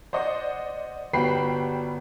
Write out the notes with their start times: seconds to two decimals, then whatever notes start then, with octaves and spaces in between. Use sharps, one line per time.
0.13 C5 D5 D#5 F#5
1.13 G1 G3 F#4 G5 B5 C7